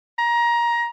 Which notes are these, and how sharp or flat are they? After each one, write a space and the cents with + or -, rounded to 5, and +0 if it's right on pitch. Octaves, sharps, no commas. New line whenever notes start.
A#5 +20